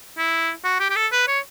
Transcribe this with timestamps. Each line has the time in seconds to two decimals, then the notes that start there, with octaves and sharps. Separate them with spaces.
0.18 E4
0.64 F#4
0.80 G4
0.90 G4
0.96 A4
1.12 B4
1.28 C#5